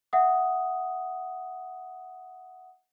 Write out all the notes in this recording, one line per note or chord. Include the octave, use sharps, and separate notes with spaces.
E5 F#5 D#6